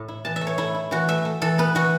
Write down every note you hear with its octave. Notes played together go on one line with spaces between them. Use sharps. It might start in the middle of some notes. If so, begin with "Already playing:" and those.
Already playing: A2 A3
E4
E3 A5
E5
A3
C#5
A3 E4
E4
E3 F#4
A3 E5
A3
E3 A4
B3 B4
E3 F#4